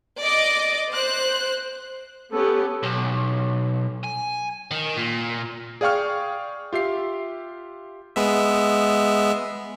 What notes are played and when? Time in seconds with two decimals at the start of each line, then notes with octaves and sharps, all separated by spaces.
0.20 D5 D#5 D6
0.91 C5 F#6
2.33 B3 C#4 G4 A4
2.83 B1
4.04 G#5
4.71 D#3
4.97 A#2
5.81 G#4 D5 F5 G5 C#6 F6
6.73 F4 G4 E5 C7
8.16 G#3 B3 E5